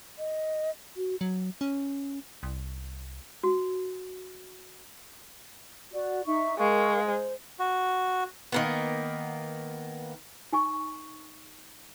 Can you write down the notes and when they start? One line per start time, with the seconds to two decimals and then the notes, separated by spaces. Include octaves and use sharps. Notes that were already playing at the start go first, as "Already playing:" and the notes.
0.19 D#5
0.96 F#4
1.21 F#3
1.61 C#4
2.43 C2
3.43 F#4
5.93 F#4 D5
6.26 D#4 E5 C#6
6.59 G#3 A#4 F5 C#6
7.00 C5
7.59 F#4
8.52 D#3 A#3 B3
10.53 D#4 G#5 C#6